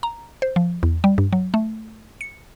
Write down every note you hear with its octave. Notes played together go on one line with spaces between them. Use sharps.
A#5
C5
F3
E2
G3
G2
F#3
A3
C#7